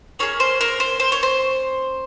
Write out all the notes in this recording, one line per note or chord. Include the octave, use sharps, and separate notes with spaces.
A#3 C#4 G#4 C#5
C5
A#4
C5
C5
C#5
C5